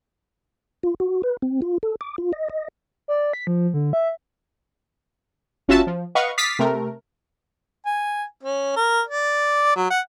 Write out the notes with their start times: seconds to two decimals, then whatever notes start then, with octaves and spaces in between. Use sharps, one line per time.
0.83 F4
1.00 F#4
1.23 B4
1.42 C4
1.62 F4
1.83 A4
2.01 D6
2.18 F4
2.33 D#5
2.50 D#5
3.08 D5
3.33 B6
3.47 F3
3.74 D3
3.93 E5
5.68 G1 C#4 F4 F#4 E5 A5
5.87 F3
6.15 B4 D#5 F5 F#5 C#6
6.38 D6 D#6 F6 A6 B6 C7
6.59 C3 A3 A#4
7.86 G#5
8.43 C#4
8.76 A#4
9.07 D5
9.76 F#3
9.90 F#5